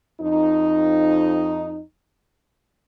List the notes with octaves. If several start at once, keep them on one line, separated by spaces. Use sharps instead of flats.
F2 D#4